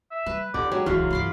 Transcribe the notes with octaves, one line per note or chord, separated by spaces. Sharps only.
E5
G3 B4
F2 D3 D#3 G4 D5
F#3 G#3 G4
D1 C2 F#2 E3 F#3 G#3 F4
G2 B5 C6 D6